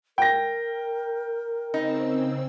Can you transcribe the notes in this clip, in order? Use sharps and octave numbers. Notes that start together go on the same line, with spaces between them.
A#4 G5 A#6
C#3 C4 D#4 E6